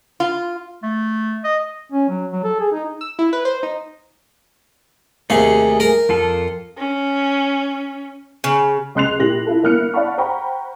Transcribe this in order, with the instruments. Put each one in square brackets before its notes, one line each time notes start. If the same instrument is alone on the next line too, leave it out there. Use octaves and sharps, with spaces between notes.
[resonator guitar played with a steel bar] F4
[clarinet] A3
D#5
[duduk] C#4
F#3
F#3
A4
G#4
D#4
[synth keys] E6
E4
B4
C5
D#4
[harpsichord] D#2 C3 F5 [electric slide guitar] A3 G#4
[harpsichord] A#4 A#5
[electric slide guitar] F2 F4 A4
[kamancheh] C#4
[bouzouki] C#3
[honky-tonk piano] C#2 D#5 C6 F#6 C7 F7
A#2 E4 G4 A#6 F#7
E4 F4 A4
G1 A#3 E4 F6 F#6 C#7
D5 F5 F#5 A5 B5 C#6
C5 F#5 G5 A#5 B5 C#6